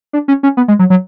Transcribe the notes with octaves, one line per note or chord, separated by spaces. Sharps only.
D4
C#4
C#4
B3
G#3
F#3
F#3